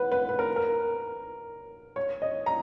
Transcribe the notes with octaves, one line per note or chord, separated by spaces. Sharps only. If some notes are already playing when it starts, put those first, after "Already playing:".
Already playing: B4 F#5
B4
B4
A#4
A#4
C#5
D#5
A#5